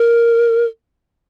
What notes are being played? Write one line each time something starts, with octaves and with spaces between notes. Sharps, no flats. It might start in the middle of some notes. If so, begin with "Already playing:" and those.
Already playing: A#4